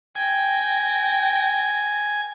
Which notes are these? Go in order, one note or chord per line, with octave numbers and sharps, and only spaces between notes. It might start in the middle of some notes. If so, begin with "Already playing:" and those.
G5 G#5 A#6